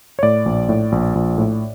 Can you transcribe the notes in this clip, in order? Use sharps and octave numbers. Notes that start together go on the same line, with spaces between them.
C#5
A2 D5
A#1
A2
A#1
A#1
A2